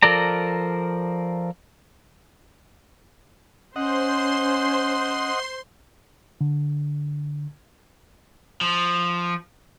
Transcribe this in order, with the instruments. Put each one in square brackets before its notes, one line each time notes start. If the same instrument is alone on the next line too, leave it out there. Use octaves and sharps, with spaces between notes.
[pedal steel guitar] F3 A4 A#4 D5 A#5
[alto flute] C#4 [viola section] C5 [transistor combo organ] D#5 F#5 [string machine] C6
[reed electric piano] D3
[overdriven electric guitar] F3